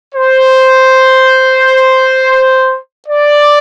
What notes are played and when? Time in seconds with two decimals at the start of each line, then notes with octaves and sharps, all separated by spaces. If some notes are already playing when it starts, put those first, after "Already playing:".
0.15 C5
3.08 D5